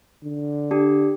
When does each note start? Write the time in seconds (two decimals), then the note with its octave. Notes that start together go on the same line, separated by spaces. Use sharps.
0.24 D3
0.71 D4 G4